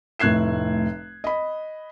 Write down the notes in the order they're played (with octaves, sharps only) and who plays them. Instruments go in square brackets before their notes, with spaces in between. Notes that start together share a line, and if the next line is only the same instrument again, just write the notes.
[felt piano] F1 A2 F#6 G#6 C7 E7
D#5 B5